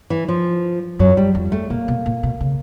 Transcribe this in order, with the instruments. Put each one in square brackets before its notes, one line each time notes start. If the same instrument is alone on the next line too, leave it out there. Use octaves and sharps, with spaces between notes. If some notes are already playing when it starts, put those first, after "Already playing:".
[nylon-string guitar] E3
F3
[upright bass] F#2 [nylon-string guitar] F#3
[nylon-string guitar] G3
[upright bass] F2
[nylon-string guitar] A3
[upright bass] B2 [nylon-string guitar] A#3
[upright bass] B2
A#2
B2
C#3